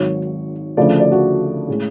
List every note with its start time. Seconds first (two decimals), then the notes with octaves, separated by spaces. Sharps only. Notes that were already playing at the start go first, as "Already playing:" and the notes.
Already playing: G#1 G#2 F#3 C#5
0.77 D2 C#3 F3 A3 D5
1.00 D5
1.12 F#4
1.68 A2 G#3 C#4